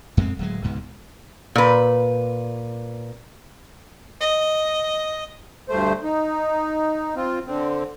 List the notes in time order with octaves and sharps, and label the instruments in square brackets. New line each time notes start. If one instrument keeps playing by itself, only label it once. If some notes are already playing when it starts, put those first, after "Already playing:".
[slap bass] F2 G#3 A3 C4
D1 F#3 G#3
C#2 G#2 B2
[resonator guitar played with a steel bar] A#2 B4
[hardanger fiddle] D#5
[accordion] D2 G2 A3 C5
D#4
C4 F4
D3 C4